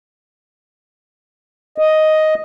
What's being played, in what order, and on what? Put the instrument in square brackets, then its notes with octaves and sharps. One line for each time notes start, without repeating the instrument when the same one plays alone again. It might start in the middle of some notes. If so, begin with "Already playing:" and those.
[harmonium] D#5